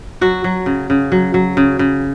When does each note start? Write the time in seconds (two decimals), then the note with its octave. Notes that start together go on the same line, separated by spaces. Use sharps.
0.21 F#3 F#4
0.44 F#3
0.66 C#3
0.90 C#3
1.12 F#3
1.34 F#3
1.57 C#3
1.79 C#3